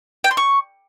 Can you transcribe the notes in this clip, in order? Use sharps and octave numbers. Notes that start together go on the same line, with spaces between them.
G5
C6
C#6